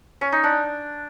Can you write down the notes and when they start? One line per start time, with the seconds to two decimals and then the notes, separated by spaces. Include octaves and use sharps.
0.21 C#4
0.32 D#4
0.44 D4